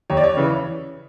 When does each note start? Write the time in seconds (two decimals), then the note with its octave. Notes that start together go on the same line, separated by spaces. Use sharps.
0.10 D#2 C#5
0.17 D5
0.24 C#5
0.37 C#3 E3